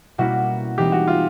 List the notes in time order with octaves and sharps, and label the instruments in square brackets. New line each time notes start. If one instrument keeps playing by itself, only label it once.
[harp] B2 G3 A#3 C#4 E4 [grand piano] F#4
[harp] E3 G#3 C4 D#4 [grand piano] G4
[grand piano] F#4
F4